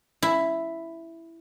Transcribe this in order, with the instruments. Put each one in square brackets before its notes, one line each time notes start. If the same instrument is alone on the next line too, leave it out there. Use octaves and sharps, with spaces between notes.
[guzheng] E4